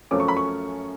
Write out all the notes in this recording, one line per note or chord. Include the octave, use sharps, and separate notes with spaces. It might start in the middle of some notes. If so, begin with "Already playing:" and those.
F#2 F3 A3 C#4 D6
C#6
B5
C#6